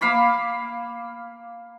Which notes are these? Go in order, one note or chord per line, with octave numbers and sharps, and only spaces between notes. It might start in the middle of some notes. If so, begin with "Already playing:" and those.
A#3 F5 B5 D6